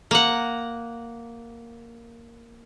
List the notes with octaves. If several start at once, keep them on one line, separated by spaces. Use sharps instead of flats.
A#3 F#5